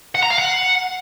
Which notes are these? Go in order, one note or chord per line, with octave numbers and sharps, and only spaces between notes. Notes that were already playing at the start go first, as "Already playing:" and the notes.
F#5
A#5
F5
F#5